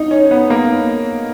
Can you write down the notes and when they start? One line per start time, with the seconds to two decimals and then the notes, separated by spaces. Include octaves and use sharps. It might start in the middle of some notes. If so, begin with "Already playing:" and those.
Already playing: D#4
0.11 C#4
0.31 B3
0.50 A#3